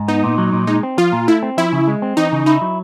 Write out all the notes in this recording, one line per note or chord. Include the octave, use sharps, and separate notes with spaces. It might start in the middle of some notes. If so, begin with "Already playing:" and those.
Already playing: G#2
B3 D#4
A#2
F#3
A#2
G#3 D#4
C4
F3 F4
A#2
A3 E4
C4
F3 E4
C#3
G#3
C4
E3 D#4
C#3
D#4 E4
F#3